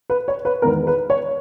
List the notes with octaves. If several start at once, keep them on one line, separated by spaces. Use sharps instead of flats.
B4
C#5
B4
E2 D#3 G#3 B3 A#4
B4
C#5